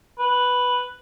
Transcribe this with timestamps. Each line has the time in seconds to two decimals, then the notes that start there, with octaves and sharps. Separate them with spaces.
0.19 B4